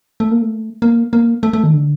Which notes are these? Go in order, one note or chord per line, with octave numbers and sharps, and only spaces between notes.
A3
A#3
A3
A#3
A#3
A3
A3
D#3
D3